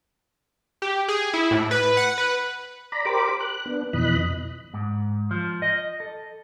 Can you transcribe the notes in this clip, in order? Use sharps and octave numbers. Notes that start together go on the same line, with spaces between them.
G4
G#4
E4
A2
B4
F#5
B4
D5 A#5 B5
G4 A#4 C5 B5 D6
F#6
B3 D4
F2 B2 E3 D#5 B5 F#6
G#2
F3
D#5
A4